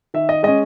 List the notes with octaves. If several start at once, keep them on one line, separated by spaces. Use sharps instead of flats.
D#3 E5
D#5
G#3 C#4 D#5